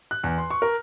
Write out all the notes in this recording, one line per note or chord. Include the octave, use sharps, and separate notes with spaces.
F#6
E2
C6
C#6
A#4